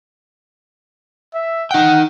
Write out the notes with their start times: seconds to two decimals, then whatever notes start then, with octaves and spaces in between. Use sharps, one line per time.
1.34 E5
1.71 D#4 F#5 G5